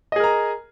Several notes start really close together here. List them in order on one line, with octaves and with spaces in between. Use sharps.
D#5 G#4 A#4 A#5